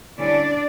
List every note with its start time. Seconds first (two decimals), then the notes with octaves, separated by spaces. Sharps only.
0.19 D3 G3 C#4 D4 E4 D5